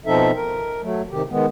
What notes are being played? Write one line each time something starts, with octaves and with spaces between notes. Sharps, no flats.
B2 F3 C4 D#4 A4 E5
A#4
F#3 A3
C3 D#3 G4
D#3 G#3 B3